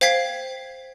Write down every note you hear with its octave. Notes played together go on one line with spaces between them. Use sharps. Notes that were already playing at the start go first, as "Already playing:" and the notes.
C5 F5 G5 G#6 B6 C7